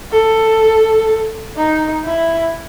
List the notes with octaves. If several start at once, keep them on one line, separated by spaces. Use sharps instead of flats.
A4
D#4
E4